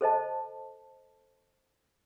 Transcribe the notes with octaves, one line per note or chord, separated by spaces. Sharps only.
A4 C5 D#5 A5